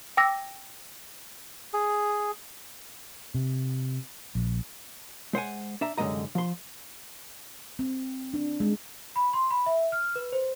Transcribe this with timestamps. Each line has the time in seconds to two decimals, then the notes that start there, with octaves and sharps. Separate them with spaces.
0.17 G5 D6 E6 A#6
1.73 G#4
3.35 C3
4.35 A#1
5.33 G#3 C5 F#5 G#5
5.81 D4 E5 A#5
5.98 C2 F#2 D3 G#3 D#5 A#5
6.35 F3 C6
7.79 C4
8.34 D4
8.60 G#3
9.16 B5
9.33 C6
9.51 B5
9.66 E5
9.92 F6
10.16 B4
10.32 C5